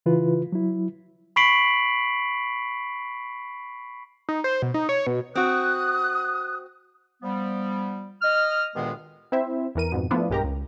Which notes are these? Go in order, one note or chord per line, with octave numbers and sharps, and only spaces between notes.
C#3 E3 E4 F4 B4
F#3 E4
B5 C#6 B6 C7 D7 F#7
D#4
C5
B2
D#4
C#5
B2
C4 F#4 D#6 F#6
F3 G3 B3
D#5 F6
D2 G2 A#2 D#3 G#3 B3
C4 E4 C5 E5
E2 E3 A#4 D#7
F2 G#2 B2
F3 A3 B3 D4 E4 F4
B1 G2 G#3 G4 A#4 A#5
C#2